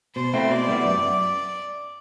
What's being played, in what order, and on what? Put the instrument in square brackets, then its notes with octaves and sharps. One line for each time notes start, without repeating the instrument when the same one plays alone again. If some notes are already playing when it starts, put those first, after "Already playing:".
[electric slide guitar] B2 [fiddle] C5
[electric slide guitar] A3 C4 E4
[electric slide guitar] B2 [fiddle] D5
[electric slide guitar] G3 B3 E4
F#2